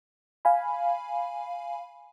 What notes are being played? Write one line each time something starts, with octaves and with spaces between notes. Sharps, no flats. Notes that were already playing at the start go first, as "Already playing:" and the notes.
F5 G#5 B5